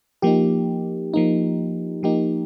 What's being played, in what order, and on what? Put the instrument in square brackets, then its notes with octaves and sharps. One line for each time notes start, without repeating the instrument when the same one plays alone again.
[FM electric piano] F3 A#3 D#4 G4
F3 A#3 D#4
F3 A#3 D#4 G4